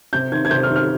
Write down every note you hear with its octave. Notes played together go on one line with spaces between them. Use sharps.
C3 G6
D#3 G#6
G#6
C3 G6
F6
D#3
F6